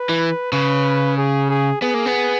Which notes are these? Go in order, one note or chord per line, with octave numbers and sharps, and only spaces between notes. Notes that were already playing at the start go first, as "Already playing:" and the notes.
Already playing: B4
E3
C#3 B4
G#4
G#4
B3 G#4
A#3
B3